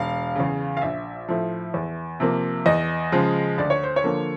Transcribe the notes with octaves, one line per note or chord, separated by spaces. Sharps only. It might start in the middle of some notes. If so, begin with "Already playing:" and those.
Already playing: E1 F5
E2 C#3
F5
A#1 E5
A2 F3
E2
C3 F3 A#3
E2 D#5
C#3 F3 G#3
D2 D5
C#5
C5
C#5
D3 F3 A#3